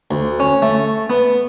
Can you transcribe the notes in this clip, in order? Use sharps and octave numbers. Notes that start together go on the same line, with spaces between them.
D2
C#4
A3
B3